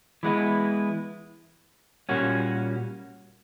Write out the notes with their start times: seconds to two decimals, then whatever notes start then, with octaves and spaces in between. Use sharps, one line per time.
0.23 E3 G#3 B3 E4
2.09 A#2 G3 A#3 C#4 F#4